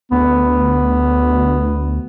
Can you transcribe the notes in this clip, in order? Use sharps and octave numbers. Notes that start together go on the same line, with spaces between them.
D2 B3